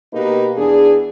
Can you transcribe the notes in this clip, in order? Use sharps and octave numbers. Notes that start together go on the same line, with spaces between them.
B2 A#3 D#4 G4 B4
E2 D4 G#4